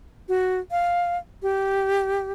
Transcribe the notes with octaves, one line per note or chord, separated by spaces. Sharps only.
F#4
F5
G4